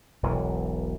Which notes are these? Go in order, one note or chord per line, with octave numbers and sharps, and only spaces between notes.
E1 B1 E3